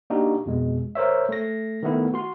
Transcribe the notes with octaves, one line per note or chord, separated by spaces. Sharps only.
A#3 D4 D#4 F#4 G4
F2 B2 G#3
A#4 C5 C#5 E5
A3 A#6
D#3 A3 B3 E4
F#4 C6